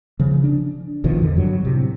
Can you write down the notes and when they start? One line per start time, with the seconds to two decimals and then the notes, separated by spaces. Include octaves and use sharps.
0.20 C#3 F3
0.44 D4
1.04 A1 B2 D#3 F3
1.20 E2 D3
1.37 G2 F#3
1.65 A2 C3